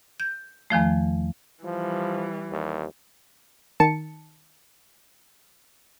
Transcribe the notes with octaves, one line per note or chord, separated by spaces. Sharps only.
G6
E2 D#3 F3 A3
E3 F3 G3
D#2
D#3 A5 C#7